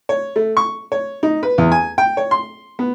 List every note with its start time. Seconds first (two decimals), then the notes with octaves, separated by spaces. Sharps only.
0.09 C#5
0.36 A3
0.57 C#6
0.92 C#5
1.23 D#4
1.43 B4
1.58 E2
1.72 G#5
1.98 G5
2.17 C#5
2.31 C6
2.79 B3